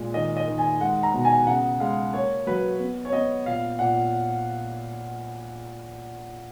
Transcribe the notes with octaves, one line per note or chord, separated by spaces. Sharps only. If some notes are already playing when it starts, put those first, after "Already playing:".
Already playing: A#2 G#3
D#3 D#5
D#5
D#3
G#5
G#3 F#5
A#5
B2
G#5
C#3 F#5
G#3 F5
A#3 C#5
F#3 B4
B3
C#5
B3 D#5
A#2 F5
A#2 F#5